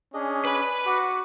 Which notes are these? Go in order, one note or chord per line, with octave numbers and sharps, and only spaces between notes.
C#4 D4 G#4 D#5
B4 B5
F#4 F#5 D6